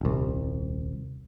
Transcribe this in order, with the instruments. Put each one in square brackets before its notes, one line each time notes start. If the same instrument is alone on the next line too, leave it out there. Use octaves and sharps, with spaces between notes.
[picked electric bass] D#1 C2